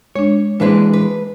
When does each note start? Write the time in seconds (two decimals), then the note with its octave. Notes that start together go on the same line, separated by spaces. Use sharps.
0.15 G#3 D4 C#5
0.60 E3 G#3 A#3 D4 B4 C5
0.93 B4